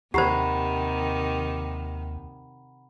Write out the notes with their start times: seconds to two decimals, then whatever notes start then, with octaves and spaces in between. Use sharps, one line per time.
0.14 D#2 C3 D#3 G4 C5 F#5 A#5 B5